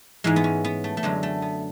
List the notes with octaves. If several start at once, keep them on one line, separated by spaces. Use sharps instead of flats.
G#2 E3 G#3
B3
C#4
B3
A3
A3
F#2 D3 F#3 G#3
A3
B3